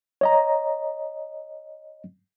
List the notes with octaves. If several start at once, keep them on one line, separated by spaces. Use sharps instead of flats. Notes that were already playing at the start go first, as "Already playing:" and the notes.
C#5 D#5 A#5